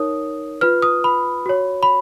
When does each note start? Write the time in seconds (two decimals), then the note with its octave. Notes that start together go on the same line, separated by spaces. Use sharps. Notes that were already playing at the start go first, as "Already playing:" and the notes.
Already playing: D#4 A#4 C#5 D#6
0.61 F4 B4 F6
0.82 D#6
1.04 B5
1.46 F#4 C#5
1.83 B5